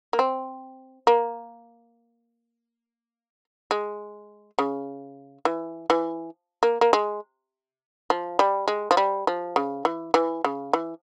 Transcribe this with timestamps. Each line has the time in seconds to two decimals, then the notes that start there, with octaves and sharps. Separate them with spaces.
0.13 A#3
0.19 C4
1.07 A#3
3.71 G#3
4.59 C#3
5.45 E3
5.90 E3
6.63 A#3
6.81 A#3
6.93 G#3
8.10 F3
8.39 G3
8.68 G#3
8.91 F3
8.97 G3
9.27 F3
9.56 C#3
9.85 E3
10.14 E3
10.44 C#3
10.73 E3